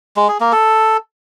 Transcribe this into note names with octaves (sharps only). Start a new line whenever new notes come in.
G#3
G#4
A#3
A4